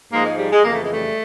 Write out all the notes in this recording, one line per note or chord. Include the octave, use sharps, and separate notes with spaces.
G#2 F3 G#3 A#3
G#3
G3
G#3
F2 C#3 E3 A#3
A3
G#3
G3 A3